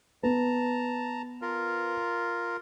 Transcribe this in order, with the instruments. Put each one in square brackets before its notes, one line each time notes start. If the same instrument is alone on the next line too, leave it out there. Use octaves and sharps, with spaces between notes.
[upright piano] B3 [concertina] A5 A#5
[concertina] F4 A#4